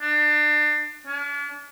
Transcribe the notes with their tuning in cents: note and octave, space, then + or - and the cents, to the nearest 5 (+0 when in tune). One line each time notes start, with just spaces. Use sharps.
D4 +30
D4 -45